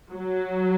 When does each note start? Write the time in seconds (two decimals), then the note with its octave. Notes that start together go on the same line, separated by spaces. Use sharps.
0.12 F#3